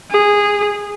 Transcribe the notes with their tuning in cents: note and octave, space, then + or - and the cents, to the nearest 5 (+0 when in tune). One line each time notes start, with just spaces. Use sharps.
G#4 -10